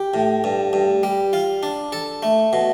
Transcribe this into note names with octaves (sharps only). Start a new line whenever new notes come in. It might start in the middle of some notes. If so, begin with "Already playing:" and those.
Already playing: G4
A2
G2
G2
G3
F4
D4
A4
A3
B2